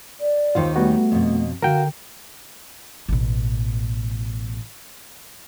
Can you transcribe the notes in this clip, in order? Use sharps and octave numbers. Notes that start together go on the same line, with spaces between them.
D5
D#2 D#3 F4 G4 C5
G3 A3 B3 F#4
F2 B2
D3 F#4 A#4 F5 G5
A1 B2